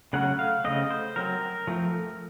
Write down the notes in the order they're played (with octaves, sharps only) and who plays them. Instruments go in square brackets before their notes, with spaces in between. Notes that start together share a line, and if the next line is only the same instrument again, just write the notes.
[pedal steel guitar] C#3 F#3 A3 C#4 F#5
F5
C#3 A3 C4 D#5
C5
F#3 C4 A#4
F3 A3 C4